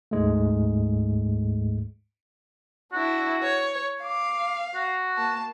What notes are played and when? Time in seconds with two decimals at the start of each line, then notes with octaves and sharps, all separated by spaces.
0.11 D2 G#2 G#3 A3
2.93 D4 E4 F#4
3.43 C#5
4.03 F5 D6
4.75 F#4
5.17 A#3 A5